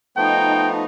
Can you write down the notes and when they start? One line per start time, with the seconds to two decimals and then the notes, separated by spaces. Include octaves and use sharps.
0.17 F3 A3 B3 D#4 G5